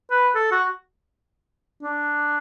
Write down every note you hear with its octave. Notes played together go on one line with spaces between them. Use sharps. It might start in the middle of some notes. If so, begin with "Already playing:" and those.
B4
A4
F#4
D4